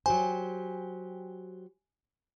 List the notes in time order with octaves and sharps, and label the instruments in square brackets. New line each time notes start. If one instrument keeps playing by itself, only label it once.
[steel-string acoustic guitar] F#3 G4 C5 [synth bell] G#5